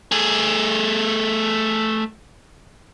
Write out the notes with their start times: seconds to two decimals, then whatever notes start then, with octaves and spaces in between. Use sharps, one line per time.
0.12 A3 G#4